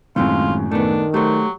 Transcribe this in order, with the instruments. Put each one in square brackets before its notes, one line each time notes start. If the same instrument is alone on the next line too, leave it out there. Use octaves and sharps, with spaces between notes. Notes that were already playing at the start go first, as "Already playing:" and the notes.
[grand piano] F#2 A2 [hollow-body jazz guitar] D#3 G#3 C4 [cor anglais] F4
[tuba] D#3 [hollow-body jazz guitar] A3 B3 [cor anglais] D4
[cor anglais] F#3 [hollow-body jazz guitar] A3 C5 [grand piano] G4